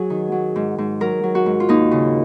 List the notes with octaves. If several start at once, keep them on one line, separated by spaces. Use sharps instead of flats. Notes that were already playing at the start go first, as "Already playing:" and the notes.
Already playing: F#3 F#4 G#4
D#3
F#3
G#2
G#2
F#3 A#4
F#3
F#4
G#2
F4
D#2 D#4
C#3